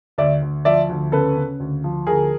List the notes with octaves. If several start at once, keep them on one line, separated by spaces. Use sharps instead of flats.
D2 D5 E5
D2
F3 D5 E5
D2
C#3 A4 B4
C#3
D2
F3
D2 G#4 A#4